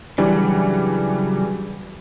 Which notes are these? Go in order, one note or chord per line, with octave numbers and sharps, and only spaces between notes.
C#3 E3 F#3 G3 D4